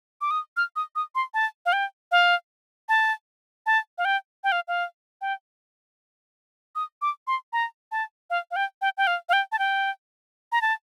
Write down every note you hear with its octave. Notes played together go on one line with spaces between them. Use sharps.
D6
D#6
F6
D#6
D#6
C6
A5
F5
G5
F5
A5
A5
F5
G5
G5
F5
F5
G5
D#6
D6
C6
A#5
A5
F5
F5
G5
G5
G5
F5
F5
G5
A5
G5
A#5
A5